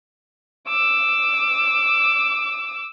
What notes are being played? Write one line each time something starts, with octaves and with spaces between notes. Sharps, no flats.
D6 E6